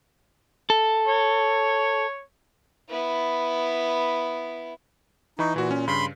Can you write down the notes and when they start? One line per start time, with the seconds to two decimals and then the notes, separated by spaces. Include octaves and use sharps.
0.70 A4
1.07 C#5
2.89 B3 E4
5.39 E3 D#4 B5 C#6
5.56 A#2 E3 F#4
5.71 C#4
5.88 G2 C#3 B5 C6